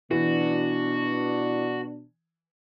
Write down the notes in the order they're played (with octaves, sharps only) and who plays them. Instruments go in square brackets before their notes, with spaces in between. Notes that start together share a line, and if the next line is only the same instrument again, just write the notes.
[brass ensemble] B2 D4 [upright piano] E3 [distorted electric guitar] F#4